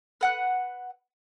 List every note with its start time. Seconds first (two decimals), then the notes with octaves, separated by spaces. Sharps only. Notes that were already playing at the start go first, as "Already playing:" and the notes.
0.21 B4 F#5 F#6